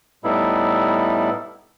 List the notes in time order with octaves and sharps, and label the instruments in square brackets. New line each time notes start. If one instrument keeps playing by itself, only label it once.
[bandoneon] A2 G3 B3 D#4 E4